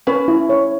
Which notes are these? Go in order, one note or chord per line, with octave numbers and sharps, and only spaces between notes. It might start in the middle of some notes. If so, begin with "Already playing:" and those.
C#4 B4
E4
C#5